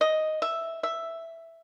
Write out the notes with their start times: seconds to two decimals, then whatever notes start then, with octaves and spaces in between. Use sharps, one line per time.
0.01 D#5
0.42 E5
0.83 E5